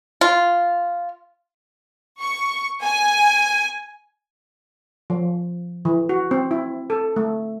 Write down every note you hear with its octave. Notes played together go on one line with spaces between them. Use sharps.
F4
C#6
G#5
F3
E3
F#4
C4
E4
A4
A3